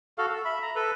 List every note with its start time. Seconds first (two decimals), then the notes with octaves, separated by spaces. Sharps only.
0.18 F#4 A4 F5
0.30 A4
0.45 E5 B5
0.62 A#5
0.75 A4 B4